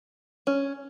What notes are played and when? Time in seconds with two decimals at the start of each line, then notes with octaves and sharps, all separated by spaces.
0.47 C#4